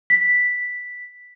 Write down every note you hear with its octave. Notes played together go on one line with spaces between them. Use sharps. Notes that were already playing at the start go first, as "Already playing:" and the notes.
B6